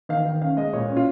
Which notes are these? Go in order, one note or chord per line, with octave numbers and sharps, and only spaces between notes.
D#3 F5
D#3
C#4 F5
G#3 D#5
A#2 C#5
C#4
F4